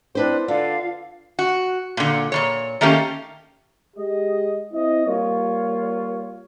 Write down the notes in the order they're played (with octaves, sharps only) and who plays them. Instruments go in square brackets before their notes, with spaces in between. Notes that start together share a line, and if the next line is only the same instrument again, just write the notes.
[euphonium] C4 [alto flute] D4 [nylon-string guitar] E4 B4 C5
[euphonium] D3 [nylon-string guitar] F4 [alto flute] D5 [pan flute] F5
[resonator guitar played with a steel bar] F#4
A#2 D3
A#2 D#3 C#5
D#3 A3 A#3 C#4 G4
[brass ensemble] G#3 G4 D#5
C4 E4 D#5
G3 A#3 F4 C#5